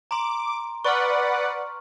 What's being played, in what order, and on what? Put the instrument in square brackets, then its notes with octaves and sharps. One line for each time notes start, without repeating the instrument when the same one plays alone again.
[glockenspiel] A#5 C6 [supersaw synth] D6
[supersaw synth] B4 D5 F#5 [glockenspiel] C#6 F6